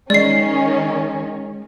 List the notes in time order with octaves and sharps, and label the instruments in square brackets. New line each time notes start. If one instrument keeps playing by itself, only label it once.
[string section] D#3 C#4 [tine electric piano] G#3 [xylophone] D5 C7